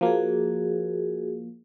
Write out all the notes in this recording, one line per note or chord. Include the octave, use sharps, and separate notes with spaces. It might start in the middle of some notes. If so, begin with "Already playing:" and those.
F3 A#3 F#4 G#4